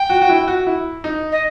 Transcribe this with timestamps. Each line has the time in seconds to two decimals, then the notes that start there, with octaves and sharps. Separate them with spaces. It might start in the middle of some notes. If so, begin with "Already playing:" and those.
Already playing: G5
0.10 F#4
0.22 F#4
0.30 E4
0.48 F#4
0.67 E4
1.04 D#4
1.32 D#5